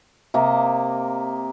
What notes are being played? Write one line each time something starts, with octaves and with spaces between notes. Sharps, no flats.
C3 A#3 D#5